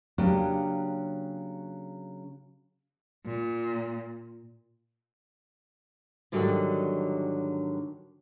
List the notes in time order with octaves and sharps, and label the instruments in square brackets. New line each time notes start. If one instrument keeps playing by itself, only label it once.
[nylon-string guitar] C#3 F#3 A#3 C#4 D4 G4
[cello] A#2
[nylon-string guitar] G#2 D3 D#3 F#3 G3